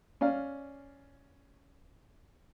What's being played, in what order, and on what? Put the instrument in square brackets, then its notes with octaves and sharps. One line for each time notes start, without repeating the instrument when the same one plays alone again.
[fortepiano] C#4 D5 F5